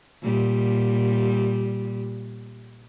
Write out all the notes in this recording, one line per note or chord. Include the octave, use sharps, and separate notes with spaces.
A#2 G3